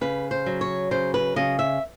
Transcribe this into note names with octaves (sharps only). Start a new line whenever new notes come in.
C#3 B4
C5
F#3
C#5
C#3 C5
B4
C#3 D#5
E5